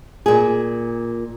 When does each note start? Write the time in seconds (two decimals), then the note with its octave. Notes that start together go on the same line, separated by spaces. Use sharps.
0.26 A#2 G#4